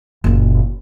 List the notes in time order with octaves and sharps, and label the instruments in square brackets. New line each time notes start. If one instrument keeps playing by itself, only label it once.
[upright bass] F#1 A#2